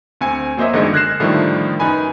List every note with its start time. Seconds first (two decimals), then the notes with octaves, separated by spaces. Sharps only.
0.21 D2 C4 G#5 C#7
0.57 F#3 A#3 C5 D#5 E5
0.73 G1 D3 D#3 G#3 D#5 C#7
0.93 F6 F#6 G#6 A#6 C7 E7
1.20 A2 D3 D#3 F3 G3 A3
1.79 F#2 D#4 B4 G#5 B5